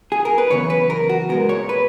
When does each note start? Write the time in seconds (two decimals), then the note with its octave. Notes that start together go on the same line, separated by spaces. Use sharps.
0.12 G#4
0.25 A#4
0.38 B4
0.50 F#2 C#3 E3 B3 C#5
0.70 B4
0.90 A#4
1.09 F#4
1.29 A#2 G#3 B3 A#4
1.49 C#5
1.69 B4